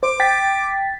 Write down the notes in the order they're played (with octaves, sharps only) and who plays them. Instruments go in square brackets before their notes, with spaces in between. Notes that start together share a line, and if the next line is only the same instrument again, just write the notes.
[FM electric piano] C5 [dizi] D6
[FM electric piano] G5 A6 B6